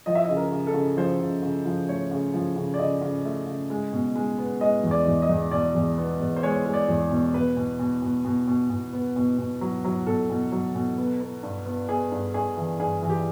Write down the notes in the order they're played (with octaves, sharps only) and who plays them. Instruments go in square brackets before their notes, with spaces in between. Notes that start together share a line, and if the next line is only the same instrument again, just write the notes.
[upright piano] F3 D#5
E5
C#3 D#5
A#4
C#3
A4
C#3
F3 C5
C#3
C#3
F3
A3 C#5
C#3
F3
C#3
D5
C#3 D#5
C#3
A3
C#3
G#3
B2
G#3
B3
G#3 D#5
E2
D5
E2
D#5
E2
B2 D5
E2
B3
E2
C5
G#3 C#5
G#3
D5
E2
B2
B2 B4
B2
B2
B2
B2
B2
B2
B3
B2
B2
F#3
F#3
B2 A4
B2
F#3
B2
B3
B3
G2
B3
B3 G#4
G2
G2 G#4
E3
G2 G#4
E3
G4